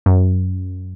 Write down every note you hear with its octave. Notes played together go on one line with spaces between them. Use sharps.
F#2